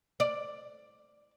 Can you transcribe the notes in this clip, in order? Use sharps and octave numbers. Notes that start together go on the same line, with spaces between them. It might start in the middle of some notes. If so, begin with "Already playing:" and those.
D5